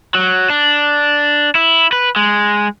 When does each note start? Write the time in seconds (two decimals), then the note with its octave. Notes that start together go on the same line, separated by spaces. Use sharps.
0.15 F#3
0.50 D4
1.55 E4
1.93 B4
2.16 G#3